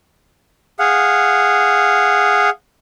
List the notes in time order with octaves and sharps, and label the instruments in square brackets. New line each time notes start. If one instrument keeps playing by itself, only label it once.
[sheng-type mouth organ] G#4 F5 F#5